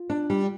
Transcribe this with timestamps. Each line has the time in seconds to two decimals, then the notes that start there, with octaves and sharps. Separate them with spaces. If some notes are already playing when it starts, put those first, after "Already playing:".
Already playing: F4
0.10 D4
0.30 G3